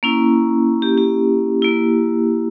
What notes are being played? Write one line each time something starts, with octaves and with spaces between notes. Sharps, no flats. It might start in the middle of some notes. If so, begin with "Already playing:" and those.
A#3 C#4 E4
G4
G4
A#3 E4